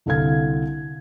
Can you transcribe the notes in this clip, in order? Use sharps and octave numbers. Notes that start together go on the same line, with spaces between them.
C2 D3 A4 F5 G#6